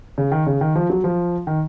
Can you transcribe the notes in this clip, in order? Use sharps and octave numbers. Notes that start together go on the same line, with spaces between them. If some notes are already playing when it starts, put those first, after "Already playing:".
C#3
D#3
C#3
D#3
F3
F#3
F3
D#3